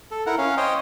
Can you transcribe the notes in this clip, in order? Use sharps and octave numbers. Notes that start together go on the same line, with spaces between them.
A4
E4 A#4 F#5
C#4 F5
C5 C#5 D#5 G5